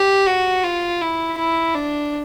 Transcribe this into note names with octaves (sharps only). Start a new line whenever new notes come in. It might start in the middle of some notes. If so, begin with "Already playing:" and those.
Already playing: G4
F#4
F4
E4
E4
D4